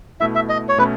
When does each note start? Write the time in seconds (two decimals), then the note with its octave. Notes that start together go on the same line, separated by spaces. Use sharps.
0.20 B2 A3 E4 E5
0.35 E5
0.49 D#5
0.69 C#5
0.78 B2 A3 C#4 B4